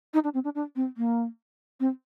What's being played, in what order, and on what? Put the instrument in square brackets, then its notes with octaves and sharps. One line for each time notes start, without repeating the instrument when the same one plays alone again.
[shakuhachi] D#4
D4
C4
D4
D4
C4
A#3
C4